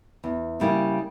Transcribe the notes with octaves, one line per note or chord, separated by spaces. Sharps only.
E2
C#3 G3 A#3 E4